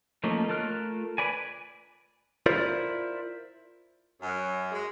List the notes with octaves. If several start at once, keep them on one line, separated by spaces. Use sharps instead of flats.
F3 A3 A#3 C#4 D#4
A3 F4 A#4 F6 F#6
B4 D5 G#5
E4 F4 A#4 C5 D5
F#2
G#3